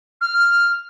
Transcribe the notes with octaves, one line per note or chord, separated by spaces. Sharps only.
F6